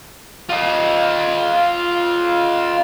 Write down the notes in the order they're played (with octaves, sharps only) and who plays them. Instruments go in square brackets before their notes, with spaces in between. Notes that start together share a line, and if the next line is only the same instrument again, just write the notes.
[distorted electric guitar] F4 D#5